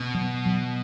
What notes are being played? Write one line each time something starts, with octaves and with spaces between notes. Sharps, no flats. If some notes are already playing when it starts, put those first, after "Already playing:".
Already playing: B2 B3
F#3
F#3